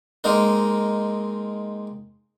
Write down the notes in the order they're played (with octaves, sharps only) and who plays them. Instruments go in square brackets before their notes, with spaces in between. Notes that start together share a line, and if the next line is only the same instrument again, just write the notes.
[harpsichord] G#3 A#3 C4 D#4 A#4